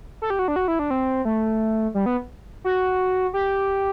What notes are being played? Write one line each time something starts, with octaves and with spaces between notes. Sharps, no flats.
A4
G4
F#4
D4
F#4
E4
D4
C4
A3
G3
B3
F#4
G4